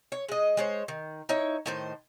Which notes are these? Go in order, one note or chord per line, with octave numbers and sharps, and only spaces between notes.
C#5
G#3 D#5
G#3 C5 C#5
D#3
D#4 E4 C#5
A2 D#3 C5